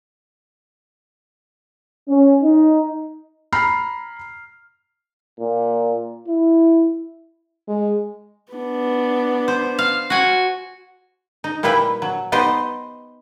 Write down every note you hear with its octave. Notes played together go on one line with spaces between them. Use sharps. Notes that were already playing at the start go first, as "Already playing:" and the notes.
C#4
D#4
A#5 B5 F6 C7
A#2
E4
G#3
B3 D4
C5
F5
F#4 G#5
D#4
A#2 G3 E4 G4 B4 G5
F#3
B3 D#4 G4 C5 D#5